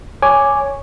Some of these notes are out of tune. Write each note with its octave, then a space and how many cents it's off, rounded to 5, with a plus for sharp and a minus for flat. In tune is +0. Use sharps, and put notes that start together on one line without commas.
C#5 +0 G#5 +0 D6 +0